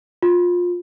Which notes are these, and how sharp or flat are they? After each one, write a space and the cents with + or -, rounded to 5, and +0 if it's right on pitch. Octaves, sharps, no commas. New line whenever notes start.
F4 +20